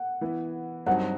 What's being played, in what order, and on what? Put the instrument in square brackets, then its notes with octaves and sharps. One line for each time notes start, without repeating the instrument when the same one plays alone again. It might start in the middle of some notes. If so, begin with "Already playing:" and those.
Already playing: [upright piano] F#5
[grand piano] E3 B3 E4
[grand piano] G2 F#3 C4 D#4 F#4 [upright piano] F#5